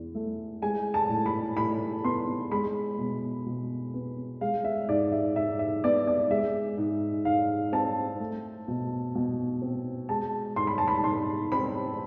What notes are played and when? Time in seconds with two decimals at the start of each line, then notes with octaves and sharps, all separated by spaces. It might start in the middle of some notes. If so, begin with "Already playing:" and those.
Already playing: E2
0.15 A3
0.62 G#3 G#5
0.94 A5
1.09 A2
1.26 B5
1.57 A2 B5
2.04 B3 C6
2.51 G#3 B5
2.98 B2
3.46 B2
3.94 B3
4.41 G#3 F5
4.64 E5
4.89 G#2 D5
5.12 E5
5.35 G#2 E5
5.59 E5
5.84 B3 D5
6.07 D5
6.31 G#3 E5
6.78 G#2
7.25 G#2 F5
7.72 C4 A5
8.20 A3
8.68 B2
9.15 B2
9.62 C4
10.09 G#3 A5
10.56 G#2 C6
10.67 B5
10.78 A5
10.88 B5
11.04 G#2 C6
11.52 C4 B5